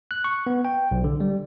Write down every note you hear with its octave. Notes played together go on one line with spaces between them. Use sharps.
F#6
C#6
B3
G5
B1
D3
G3